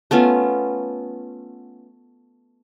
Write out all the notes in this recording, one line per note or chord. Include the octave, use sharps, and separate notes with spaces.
A3 B3 C#4 F4